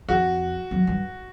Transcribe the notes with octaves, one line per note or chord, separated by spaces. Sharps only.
F2 F#4
F#2
G2